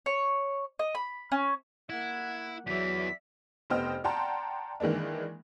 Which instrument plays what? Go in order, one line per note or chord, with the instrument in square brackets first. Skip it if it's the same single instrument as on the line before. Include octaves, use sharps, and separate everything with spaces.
[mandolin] C#5
D#5
B5
C#4
[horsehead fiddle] A#3 F#5 [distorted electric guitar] E4 [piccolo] G#6
[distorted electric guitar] E2 E3 [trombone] F#3 [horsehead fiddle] D5 E5 [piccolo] B6
[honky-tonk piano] F1 B3 C5 D#5 G5 F6
D5 F#5 G5 A5 A#5 C6
D#3 E3 G#3 A#3 D4